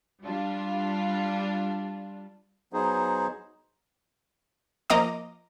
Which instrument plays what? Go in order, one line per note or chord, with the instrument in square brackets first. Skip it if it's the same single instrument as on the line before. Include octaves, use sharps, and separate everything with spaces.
[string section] G3 D4 F4
[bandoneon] F#3 B3 D#4 G#4 C5
[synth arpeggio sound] F3 A#3 D#5 A#5 D6